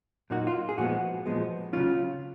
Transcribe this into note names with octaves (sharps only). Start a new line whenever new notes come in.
A#2 F#3 A#3 D#4 F#4
F4
G#4
A#2 F3 G#3 B3 F#4
A#2 F3 G#3 B3
C#3 F#3 C#4 F4